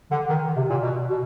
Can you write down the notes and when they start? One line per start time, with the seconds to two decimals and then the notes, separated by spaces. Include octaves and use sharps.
0.11 D3
0.29 D#3
0.56 C3
0.69 A#2
0.82 B2
1.09 B2